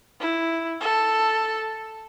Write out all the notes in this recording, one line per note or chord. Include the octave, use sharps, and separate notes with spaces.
E4
A4